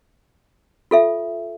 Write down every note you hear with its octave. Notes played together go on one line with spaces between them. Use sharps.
F4 A4 E5